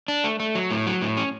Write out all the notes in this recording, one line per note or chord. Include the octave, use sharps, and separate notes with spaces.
D4
A3
A3
F#3
A2
F#3
A2
C#4